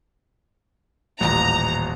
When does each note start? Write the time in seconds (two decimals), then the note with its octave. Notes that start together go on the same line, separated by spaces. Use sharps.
1.20 D#1 A1 A#5